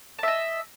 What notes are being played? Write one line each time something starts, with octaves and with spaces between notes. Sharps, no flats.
D#5 E5 A5